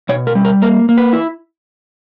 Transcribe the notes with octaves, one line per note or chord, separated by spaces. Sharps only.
B2 C#5
A#4
G3
A#4
A#3 A#4
A#3
B4
E4